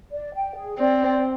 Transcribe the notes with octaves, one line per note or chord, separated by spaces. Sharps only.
D5
G5
G#4
C4 D5
G5